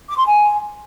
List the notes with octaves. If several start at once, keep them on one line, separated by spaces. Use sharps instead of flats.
D6
C6
G#5